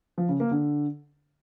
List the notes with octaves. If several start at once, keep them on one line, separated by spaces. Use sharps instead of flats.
F3
C#3
A#3
D3